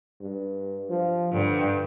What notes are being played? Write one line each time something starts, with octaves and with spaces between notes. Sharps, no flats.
G2
F3
G2 D3